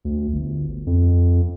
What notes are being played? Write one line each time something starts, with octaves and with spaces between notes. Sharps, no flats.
D2
G1
F2